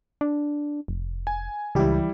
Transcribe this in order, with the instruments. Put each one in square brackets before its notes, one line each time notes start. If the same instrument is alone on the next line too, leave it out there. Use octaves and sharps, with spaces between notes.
[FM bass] D4
F1
[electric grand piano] G#5
[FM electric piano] C#2 G4 [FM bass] E3 [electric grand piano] G3 E4